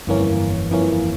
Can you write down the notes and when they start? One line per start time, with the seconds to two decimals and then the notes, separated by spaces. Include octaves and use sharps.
0.07 G1 F2 E3 A#3 C#4
0.70 G1 F2 E3 A#3 C#4